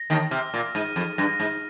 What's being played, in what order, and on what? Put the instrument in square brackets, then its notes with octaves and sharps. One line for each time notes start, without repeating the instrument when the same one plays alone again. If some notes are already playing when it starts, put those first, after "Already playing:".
Already playing: [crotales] A#6
[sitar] D#2 D#3
[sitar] C3 [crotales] F6
[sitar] A#2
[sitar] G#2 [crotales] D#7
[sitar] F2
[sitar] G2 [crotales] A#6
[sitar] G#2